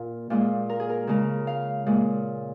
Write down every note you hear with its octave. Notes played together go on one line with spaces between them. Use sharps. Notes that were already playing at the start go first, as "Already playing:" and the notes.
Already playing: A#2 F4
A#2 G#3 F4
A#4
G#4
A#4
C#3 G#3 A#4
F5
A#2 G#3